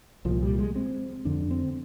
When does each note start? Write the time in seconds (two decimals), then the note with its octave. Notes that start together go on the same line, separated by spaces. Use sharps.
0.25 C2 A#2 F3
0.43 G3
0.59 G#3
0.76 C4
1.25 F2 D3 D4
1.51 C4